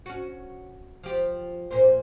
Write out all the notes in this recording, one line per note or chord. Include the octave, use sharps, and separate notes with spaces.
C#4 F#4
F3 G4
A#2 A#3 C5